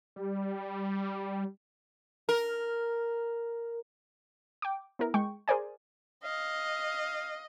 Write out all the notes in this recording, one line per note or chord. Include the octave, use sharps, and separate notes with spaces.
G3
A#4
G5 D6
B3 E4 A#4
G#3 G5 C#6
G#4 A#4 C5 D5 G#5
D#5 F5